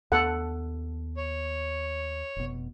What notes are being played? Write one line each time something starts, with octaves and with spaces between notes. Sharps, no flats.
D#2 B3 A4 F#5
C#5
F1 B2